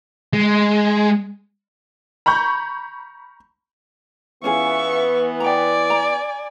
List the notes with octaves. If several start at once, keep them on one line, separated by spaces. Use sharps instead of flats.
G#3
A#5 B5 C#6 G6
E3 B3 C#4 F4 G#4 E5 C#6
D5 G5 G#5 A#5
A#5